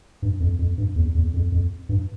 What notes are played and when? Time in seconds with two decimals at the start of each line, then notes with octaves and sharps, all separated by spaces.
0.22 G2
0.40 F2
0.59 F2
0.78 G2
0.96 E2
1.15 E2
1.34 F2
1.52 F2
1.89 G2